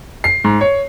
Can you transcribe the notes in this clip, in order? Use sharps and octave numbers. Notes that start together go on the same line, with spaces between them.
C7
G#2
C#5